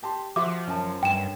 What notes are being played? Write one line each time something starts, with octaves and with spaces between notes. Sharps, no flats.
G4 A5 C6
F3 F#4 E5 C6 D6
F#2 A5
G2 G5 E7